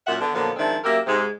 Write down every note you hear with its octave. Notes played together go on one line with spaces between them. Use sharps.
F#2 A#2 E5 F#5
D3 B3
A#2 D3 F3 F#3 A#3 B3
D#3 F3 G#3 C4 D4 E4
F#2 A#3 G4 A#4 E5
G#2 C3 G#3